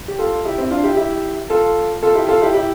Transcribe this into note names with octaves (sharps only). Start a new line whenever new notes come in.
G4
F4 A4
E4 G4
C4 E4
D4 F4
E4 G4
E4 G4
F4 A4
F4 A4
E4 G4
F4 A4
E4 G4
E4 G4